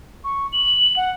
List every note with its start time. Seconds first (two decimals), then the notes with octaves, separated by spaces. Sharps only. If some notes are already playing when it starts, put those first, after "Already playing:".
0.24 C#6
0.53 F#7
0.96 F#5